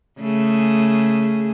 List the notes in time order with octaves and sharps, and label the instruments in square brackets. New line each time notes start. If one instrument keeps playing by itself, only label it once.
[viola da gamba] C#3 A3 G#4